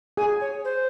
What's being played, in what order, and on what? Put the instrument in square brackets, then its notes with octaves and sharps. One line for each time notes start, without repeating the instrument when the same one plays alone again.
[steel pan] G#4 [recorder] G#5
[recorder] C#5
C5